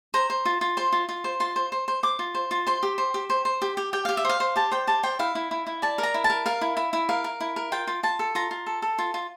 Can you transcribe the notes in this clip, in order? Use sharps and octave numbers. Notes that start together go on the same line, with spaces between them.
C5 A#5
C5
F4
F4
C5 C6
F4
F4
C5
F4 C6
C5
C5
C5
C5 D6
F4
C5
F4
C5 C6
G4
C5
G4
C5
C5
G4
G4
G4 G5
G4 F5
E5
C5 F5
C5
G4 A5
C5 G5
G4 A5
C5 G5
E4 F5
E4
E4
E4
D5 A5
A#4
A#5
E4
A5
A#4
A#4 F5
E4
E4
E4
A#4 F5
A#4
E4
A#4
F4 G5
F4
F4 A5
A4
F4 A#5
F4
A4
A4
F4
F4